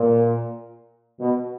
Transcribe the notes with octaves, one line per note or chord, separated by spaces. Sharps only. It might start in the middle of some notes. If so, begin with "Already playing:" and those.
Already playing: A#2
B2